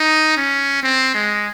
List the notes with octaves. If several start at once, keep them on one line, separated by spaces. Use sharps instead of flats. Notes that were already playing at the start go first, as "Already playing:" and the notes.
Already playing: D#4
C#4
C4
G#3